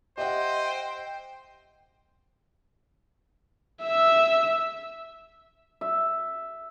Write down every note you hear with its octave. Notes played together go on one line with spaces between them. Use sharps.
G4 C5 D#5 E5 F#5 G5
E5 E6
E5